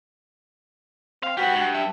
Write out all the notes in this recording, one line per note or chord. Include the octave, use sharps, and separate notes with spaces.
C4 F5
F#4 G4 B4
G2
E5